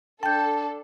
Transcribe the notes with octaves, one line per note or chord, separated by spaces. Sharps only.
D4 A4 G5 A5 G6